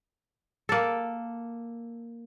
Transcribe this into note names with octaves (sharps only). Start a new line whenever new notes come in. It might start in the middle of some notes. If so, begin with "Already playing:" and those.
A#3 A4